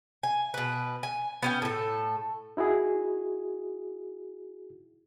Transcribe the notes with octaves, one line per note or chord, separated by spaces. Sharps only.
G#5
B2 B4
G#5
B3 C#4 G5
A2 A4
D#4 E4 F#4 G#4